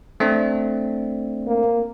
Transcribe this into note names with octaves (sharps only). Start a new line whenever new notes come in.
A3 C4 D4
A#3